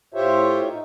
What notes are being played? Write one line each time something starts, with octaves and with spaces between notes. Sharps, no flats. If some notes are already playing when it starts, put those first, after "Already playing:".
A2 F4 G4 C5 C#5 E5
D#4